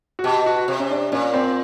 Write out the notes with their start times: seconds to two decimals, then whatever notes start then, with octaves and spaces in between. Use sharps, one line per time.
0.19 F#4
0.24 B2 G4
0.46 F#4
0.68 C3
0.80 C#4
0.91 D4
1.12 A#2 C#4
1.34 C4